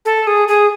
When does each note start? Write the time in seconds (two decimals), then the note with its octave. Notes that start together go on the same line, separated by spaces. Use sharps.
0.05 A4
0.27 G#4
0.48 G#4